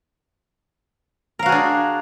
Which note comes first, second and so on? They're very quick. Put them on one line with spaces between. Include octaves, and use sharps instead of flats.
A#4 F5 F#4 G#4 D4